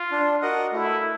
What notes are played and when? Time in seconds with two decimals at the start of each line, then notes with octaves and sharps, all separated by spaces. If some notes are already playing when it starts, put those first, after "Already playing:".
Already playing: F4
0.12 D4
0.42 F#4 A#4 D#5 F#5
0.72 A3 E4